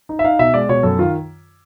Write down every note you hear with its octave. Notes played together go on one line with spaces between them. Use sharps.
D#4
E5
D#4 F5
B2 E5
G#3 D5
B2 C#5
F#2 A4
D#3 F4